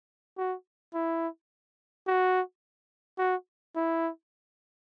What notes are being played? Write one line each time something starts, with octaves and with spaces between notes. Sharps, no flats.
F#4
E4
F#4
F#4
E4